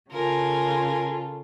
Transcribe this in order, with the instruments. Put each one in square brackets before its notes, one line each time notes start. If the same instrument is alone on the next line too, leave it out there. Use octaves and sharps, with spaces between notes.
[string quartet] C#3 F4 A4 [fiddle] A#4 G#5